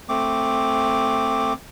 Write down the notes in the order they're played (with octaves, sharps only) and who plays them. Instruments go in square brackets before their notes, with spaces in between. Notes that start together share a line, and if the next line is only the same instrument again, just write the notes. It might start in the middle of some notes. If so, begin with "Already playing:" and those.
[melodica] A3 C4 D6